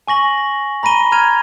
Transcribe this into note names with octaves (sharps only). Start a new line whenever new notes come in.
G#5 C#6 A#6 F#7
A#6
A#5 B5 A#6 D#7 G7
A#5 F6 G#6 D#7 F7